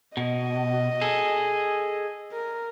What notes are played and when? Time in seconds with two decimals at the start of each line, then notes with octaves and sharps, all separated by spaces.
0.17 B2 D#5
1.01 G#4 A4
2.32 A#4